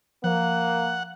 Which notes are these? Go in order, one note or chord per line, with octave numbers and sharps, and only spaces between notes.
F3 A#3 F#5